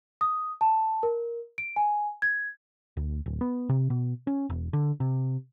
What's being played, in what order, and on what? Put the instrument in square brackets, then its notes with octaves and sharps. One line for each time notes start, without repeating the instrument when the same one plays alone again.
[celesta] D#6
A5
A#4
D7
G#5
G#6
[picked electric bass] D2
D1
B3
C3
B2
C#4
E1
D3
C3